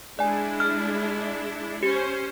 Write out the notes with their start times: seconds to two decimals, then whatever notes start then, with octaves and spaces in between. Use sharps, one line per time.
0.19 G#3 D4 E4 D5 G#5
0.60 F6
1.83 C#4 G4 C5